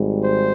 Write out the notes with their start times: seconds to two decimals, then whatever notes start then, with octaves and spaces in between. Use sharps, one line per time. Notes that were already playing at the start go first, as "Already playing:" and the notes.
Already playing: G#1 G#2 G3
0.23 C5